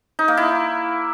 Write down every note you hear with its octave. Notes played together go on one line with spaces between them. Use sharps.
D#4
A#3
E4